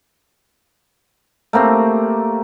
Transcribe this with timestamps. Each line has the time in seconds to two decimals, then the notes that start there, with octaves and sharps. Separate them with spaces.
1.53 A3 A#3 C4 G4